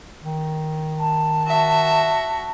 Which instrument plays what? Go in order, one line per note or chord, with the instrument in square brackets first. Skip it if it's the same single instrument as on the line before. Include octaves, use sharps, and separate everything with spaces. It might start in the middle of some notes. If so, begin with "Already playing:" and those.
[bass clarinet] D#3
[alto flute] A5
[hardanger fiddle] F#4 E5